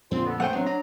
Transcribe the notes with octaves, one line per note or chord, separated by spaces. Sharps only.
F2 A#2 D3 C4 F4
B3 A4
F#2 A3 B3 C5 F#5 G5
A1 F#3 B3 C4 D4
D4 A#5